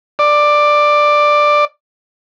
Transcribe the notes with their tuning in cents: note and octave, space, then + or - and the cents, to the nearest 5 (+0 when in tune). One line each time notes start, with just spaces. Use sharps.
D5 +10